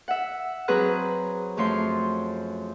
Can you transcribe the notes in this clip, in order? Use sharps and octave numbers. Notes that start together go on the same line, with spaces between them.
E5 F#5
F#3 C4 G#4 B4 A#5 F#6
F#2 F3 A3 C#5 C6